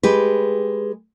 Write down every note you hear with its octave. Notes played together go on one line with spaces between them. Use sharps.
G#3 G4 B4